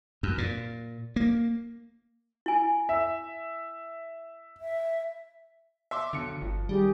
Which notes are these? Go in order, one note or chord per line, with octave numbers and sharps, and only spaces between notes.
F#2
A#2
A#3
E4 G#5
E5
E5
E5 C6 D6
B1 D3 C#7
G1 F3
D#3 G3 G4 G#4